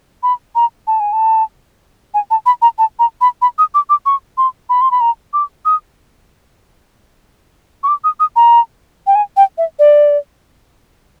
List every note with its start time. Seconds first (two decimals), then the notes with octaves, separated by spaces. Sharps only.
0.23 B5
0.55 A#5
0.87 A5
1.00 G#5
1.13 A5
2.14 G#5
2.31 A5
2.46 B5
2.62 A#5
2.78 A5
2.99 A#5
3.21 B5
3.42 B5
3.58 D#6
3.74 D6
3.90 D6
4.06 C#6
4.38 C6
4.69 B5
4.81 C6
4.91 B5
5.01 A#5
5.33 D6
5.65 D#6
7.83 C#6
7.88 D6
8.04 D#6
8.20 D#6
8.36 A#5
9.07 G5
9.15 G#5
9.37 G5
9.58 E5
9.79 D5